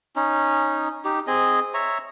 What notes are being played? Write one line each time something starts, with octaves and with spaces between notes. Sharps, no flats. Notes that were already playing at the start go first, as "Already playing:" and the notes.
C#4 D#4
D#4 G4
C4 G#4 D#5
C#5 E5 A#5